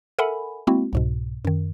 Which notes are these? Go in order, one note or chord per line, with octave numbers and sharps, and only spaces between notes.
A4 A#4 E5 F#5 G#5 B5
G#3 A#3 C4 E4 F#4
C2 G#2 B2
F#2 D#3